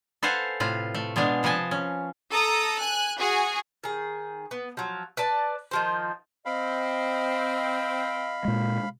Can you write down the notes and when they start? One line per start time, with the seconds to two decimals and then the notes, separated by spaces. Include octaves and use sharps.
0.23 A4 B4 C5 F5 F#5 G#5
0.60 A2 C3 F4 B4
0.94 A3
1.16 B2 G#3 B3 D4 F5
1.43 C3 F3 B4 D#5 G#5 A5
1.71 C#4
2.31 A4 A#5 D#6
2.80 G#5 F#6
3.19 F#4 G#4 G#5
3.84 D#3 G#4
4.51 B3
4.77 F3 F#3
5.17 B4 D5 A5
5.71 D#3 F3 C5
6.46 C4 D#5 F5 B5
8.45 A#2 G#3